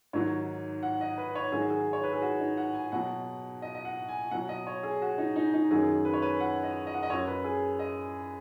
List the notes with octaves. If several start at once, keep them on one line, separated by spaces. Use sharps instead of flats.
G#2 D#3 F#3 C#5
F#5
D#5
B4
C#5
G#2 D#3 F#3 G#4
F#4
G#4
C#5
B4
G#4
F#4
D#4
F#5
G#5
B2 F#3 F#5
D#5
D#5
F#5
G#5
B2 F#3 F#5
D#5
C#5
G#4
F#4
D#4
D#4
D#4
F#2 D#3 F#3 G#4
B4
C#5
B4
F#5
D#5
D#5
F#5
D#5
F#2 F#3 C#5
B4
G#4
D#5